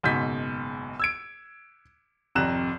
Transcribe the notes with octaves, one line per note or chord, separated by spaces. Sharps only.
F#1 G#2 B2 G6 B6
E6 G#6 D7
G#1 F2 C3 A#5 F#6 E7